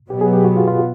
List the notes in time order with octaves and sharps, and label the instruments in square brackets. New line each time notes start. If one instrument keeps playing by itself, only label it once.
[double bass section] B2 F#3 B3 [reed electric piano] G4
[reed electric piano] G#4
G4
F#4
F4
F4